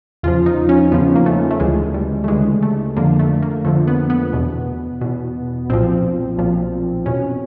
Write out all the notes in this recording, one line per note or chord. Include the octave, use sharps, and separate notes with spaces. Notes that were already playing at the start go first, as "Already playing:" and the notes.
E2 C#3 F3 F4
D#4
C#4
E2 C#3 F3 B3
A#3
A3
A3
D2 C#3 E3 G#3
G3
A3
D2 C#3 E3 G#3
A3
F2 D3 F3 A#3
A3
A#3
F2 D3 F3 A3
B3
B3
E2 B2
E2 B2
B1 A#2 F3 C4
B1 A#2 F3
E2 B2 C#4